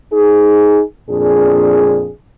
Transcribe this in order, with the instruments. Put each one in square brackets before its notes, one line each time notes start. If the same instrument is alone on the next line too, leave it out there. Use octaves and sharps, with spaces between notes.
[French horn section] D#4 G#4
F2 A#2 D4 G#4